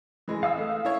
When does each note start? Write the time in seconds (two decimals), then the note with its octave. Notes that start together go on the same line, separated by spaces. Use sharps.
0.28 E3 G#3
0.43 F5 D#6 E6
0.58 A3
0.85 E4 C#5